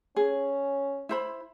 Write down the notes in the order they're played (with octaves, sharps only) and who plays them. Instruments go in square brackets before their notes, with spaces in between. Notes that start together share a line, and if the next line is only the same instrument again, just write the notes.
[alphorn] C#4 [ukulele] G#4
[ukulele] E4 C5 B5